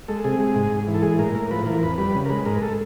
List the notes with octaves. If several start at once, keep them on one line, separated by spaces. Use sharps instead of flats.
G#3 A4
C3 G#4
G#3
G#2
G#2
E3
A4
G#3 G#4
A2 A#4
A2 A#4
F3 B4
E3 A#4
F2 B4
G3 B4
C#3
A#4
G#3 B4
G#2 A#4
A4